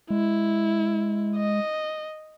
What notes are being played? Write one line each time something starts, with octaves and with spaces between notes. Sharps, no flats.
G#3 E4
D#5